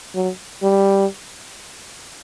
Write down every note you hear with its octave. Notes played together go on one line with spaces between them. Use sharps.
F#3
G3